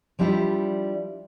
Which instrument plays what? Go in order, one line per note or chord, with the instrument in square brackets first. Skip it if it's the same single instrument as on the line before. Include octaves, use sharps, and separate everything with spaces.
[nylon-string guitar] F3 G3 D4 E4 F4